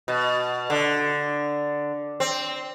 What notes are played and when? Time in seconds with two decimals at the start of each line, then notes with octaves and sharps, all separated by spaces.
0.08 B2
0.70 D3
2.20 C4